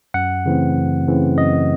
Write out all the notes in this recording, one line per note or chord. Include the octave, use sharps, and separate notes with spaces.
F#2 F#5
C#3 E3 A3 C4
F#2
C#3 E3 A3 C4
F#2 D#5